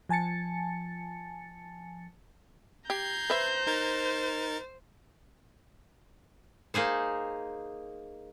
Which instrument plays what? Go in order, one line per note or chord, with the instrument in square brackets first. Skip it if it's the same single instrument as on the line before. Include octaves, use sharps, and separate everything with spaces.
[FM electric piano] F3 G#5 A5 A6 C#7
[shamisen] G4 [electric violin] A#5 G6 [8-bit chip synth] G#6 C7
[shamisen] B4 E5 [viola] C5
[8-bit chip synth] D#4 A#4 A6
[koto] A#3 D#4 G#4 C5